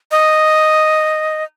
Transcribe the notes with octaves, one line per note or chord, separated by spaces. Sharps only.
D#5